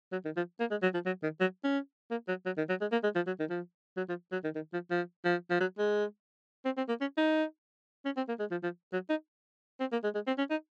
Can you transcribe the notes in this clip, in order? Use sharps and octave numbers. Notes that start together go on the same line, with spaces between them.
F#3
D#3
F3
A#3
G#3
F#3
F3
F#3
D#3
F#3
C#4
A#3
F#3
F#3
D#3
F#3
G#3
A#3
G#3
F3
F#3
D#3
F3
F#3
F3
F#3
D#3
D#3
F3
F3
F3
F3
F#3
G#3
C4
C4
A#3
C#4
D#4
C#4
C4
A#3
G#3
F3
F3
F#3
D#4
C4
A#3
G#3
G#3
C4
C#4
D#4